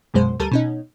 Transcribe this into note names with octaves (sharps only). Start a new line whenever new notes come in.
A#1 F#2 B2 G#3 C5
D2 G3 A4 A#4 A5 D#7
B2 C#4 D#4